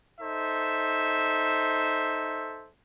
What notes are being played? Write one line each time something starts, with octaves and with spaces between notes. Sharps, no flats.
D#4 A4 C5 E5